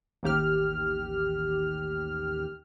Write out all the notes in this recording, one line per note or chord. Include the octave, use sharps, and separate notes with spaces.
A1 D#2 G4 F6